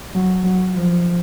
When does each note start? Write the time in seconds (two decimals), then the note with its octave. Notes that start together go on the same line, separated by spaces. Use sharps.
0.15 F#3
0.44 F#3
0.73 F3